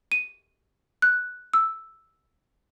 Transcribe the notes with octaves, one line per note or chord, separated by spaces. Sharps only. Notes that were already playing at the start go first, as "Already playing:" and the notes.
D#7
F#6
E6